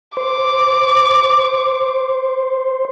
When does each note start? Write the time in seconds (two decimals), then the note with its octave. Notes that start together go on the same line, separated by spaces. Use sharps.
0.17 C5 D6